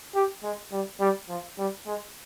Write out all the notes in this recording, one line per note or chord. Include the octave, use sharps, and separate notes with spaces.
G4
G#3
G3
G3
F3
G3
G#3